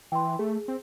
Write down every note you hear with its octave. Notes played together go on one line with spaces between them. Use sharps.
E3 G5 C6
A3 G#4
C4